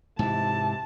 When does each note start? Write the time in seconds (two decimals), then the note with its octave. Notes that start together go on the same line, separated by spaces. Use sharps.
0.19 G#2 C3 E3 A5